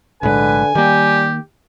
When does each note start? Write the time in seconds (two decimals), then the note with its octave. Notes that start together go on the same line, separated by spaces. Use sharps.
0.23 B1 A2 D3 G#3 B4 G#5
0.75 D#3 G3 A#3 G4